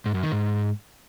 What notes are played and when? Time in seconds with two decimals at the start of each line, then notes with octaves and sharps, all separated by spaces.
0.06 G#2
0.14 F#2
0.23 D#3
0.32 G#2